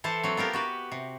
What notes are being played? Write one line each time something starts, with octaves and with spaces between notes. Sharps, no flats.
E3 E4 A4 C5 A5
F#3 C4
B3 F4 G4 A#4
F#4 G4 B4
C3